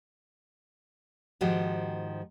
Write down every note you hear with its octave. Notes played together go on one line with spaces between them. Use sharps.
G#2 D#3 F3 F#4 G4